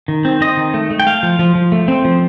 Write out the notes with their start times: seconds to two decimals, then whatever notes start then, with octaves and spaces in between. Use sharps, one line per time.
0.08 D#3
0.25 C4
0.41 C4 D#5
0.57 D#3
0.74 A3
0.91 A3
1.00 G5
1.06 A3 F5
1.23 F3
1.39 F3
1.55 F3
1.72 A3
1.88 C4
2.05 F3